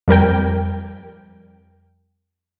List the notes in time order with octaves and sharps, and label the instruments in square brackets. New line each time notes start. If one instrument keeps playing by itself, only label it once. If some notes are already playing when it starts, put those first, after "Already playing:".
[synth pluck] F2 G3 A#4 G5